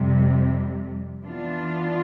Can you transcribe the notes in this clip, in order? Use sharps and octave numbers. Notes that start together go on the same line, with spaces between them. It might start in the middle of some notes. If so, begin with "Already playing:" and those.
Already playing: F2 C3 G3
E3 B3 D4 F4